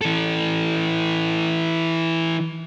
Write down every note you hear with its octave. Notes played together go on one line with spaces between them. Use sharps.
E3 A4